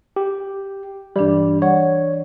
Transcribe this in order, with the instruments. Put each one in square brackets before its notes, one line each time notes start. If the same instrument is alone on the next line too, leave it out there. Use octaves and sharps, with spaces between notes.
[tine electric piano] G4
[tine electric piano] G2 G3 [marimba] E3 D4
[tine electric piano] C#5 [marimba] D5 F#5